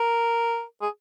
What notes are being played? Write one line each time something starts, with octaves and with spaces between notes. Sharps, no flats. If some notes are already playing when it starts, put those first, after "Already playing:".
Already playing: A#4
G#4